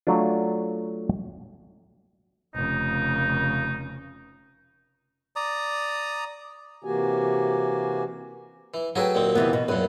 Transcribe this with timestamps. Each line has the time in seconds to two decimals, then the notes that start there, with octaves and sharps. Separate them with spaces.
0.07 F#3 A3 D4 F4
2.55 F1 C#3 D#4
5.36 D5 A#5 D#6
6.84 C3 E3 A#3 F#4 G4 G#5
8.74 E3
8.96 F#3 G#4 A4 B4 G5
9.15 D#2 A#2 C4
9.35 C3 E3 B3
9.53 B2
9.68 F#2 A#2 B4